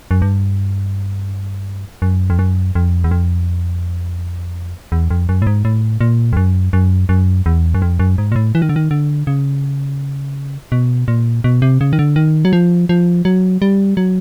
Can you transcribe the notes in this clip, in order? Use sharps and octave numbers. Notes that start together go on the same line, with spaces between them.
F#2
G2
F#2
F2
F#2
F2
E2
F2
E2
F2
F#2
A2
G#2
A2
A#2
F2
F#2
F#2
F#2
E2
F#2
F2
F#2
G#2
A#2
A2
E3
D#3
D3
D#3
D3
C#3
B2
A#2
B2
C3
C#3
D#3
D3
D#3
F#3
F3
F3
F#3
G3
F#3